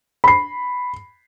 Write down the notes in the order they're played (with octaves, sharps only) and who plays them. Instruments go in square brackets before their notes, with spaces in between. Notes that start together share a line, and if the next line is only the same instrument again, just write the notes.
[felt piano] B5 C7